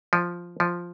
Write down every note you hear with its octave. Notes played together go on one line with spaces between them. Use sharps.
F3
F3